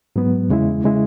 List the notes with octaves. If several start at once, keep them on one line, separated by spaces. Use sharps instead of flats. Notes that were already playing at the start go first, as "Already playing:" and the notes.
G#2 F#3 B3
E2 C#3 G#3 E4
C#3 G#3 E4